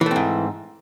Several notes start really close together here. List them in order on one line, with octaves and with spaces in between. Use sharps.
E3 A3 C4 G#2